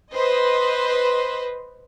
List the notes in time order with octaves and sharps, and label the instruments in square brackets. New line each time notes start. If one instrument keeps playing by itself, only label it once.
[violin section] B4 C5 D#5